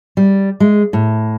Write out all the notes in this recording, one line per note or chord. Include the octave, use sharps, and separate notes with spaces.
G3
G#3
A2